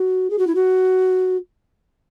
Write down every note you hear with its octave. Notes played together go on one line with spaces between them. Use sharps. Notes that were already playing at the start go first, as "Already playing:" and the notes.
Already playing: F#4
G#4
F#4
E4
F#4